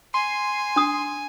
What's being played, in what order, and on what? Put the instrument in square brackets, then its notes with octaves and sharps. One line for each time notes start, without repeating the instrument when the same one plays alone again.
[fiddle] G#5 [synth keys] C6
[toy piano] D4 D#6